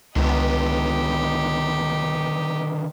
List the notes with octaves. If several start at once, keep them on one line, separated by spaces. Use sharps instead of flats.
C#2 D3 D#3 B3 D#4 G4